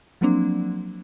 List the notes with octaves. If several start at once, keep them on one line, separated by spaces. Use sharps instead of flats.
F3 F#3 A#3 C4 D4